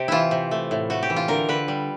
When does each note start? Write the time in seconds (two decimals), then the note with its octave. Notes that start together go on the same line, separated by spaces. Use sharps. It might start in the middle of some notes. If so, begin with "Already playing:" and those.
Already playing: C3 G4
0.08 E3 E4 F4
0.31 C3
0.51 A3
0.71 A2
0.90 A3 F#4
1.03 G4
1.10 E3
1.16 F4
1.28 D3 A#4
1.49 D3 B4
1.68 G3